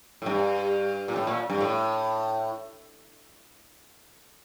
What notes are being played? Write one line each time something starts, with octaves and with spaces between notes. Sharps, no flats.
A2
G2
A#2
A2
A#2
G2
A2